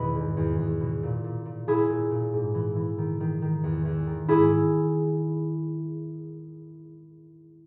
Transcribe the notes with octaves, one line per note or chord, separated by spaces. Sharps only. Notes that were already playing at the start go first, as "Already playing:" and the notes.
Already playing: E2 B2 D#3 B4 D#5
G#2
E2
E2
B2
A#2
A#2
A#2
A#2 E4 G#4
A#2
A#2
G#2
E3
E3
D#3
D#3
D#3
E2
E2
D#3
G#2 E4 G#4